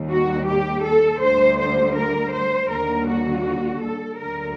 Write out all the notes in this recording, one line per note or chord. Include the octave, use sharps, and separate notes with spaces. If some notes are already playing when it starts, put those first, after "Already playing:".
Already playing: D#2 D#3 G3
F#4
G4
A4
D2 D3 G3 C5
C5
A#4
C5
D#2 D3 G3 A#4
F#4
A4
D2 D3 F#3 A#4